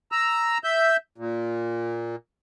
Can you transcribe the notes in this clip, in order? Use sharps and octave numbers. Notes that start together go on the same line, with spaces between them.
A#5 E6
E5 G6
A#2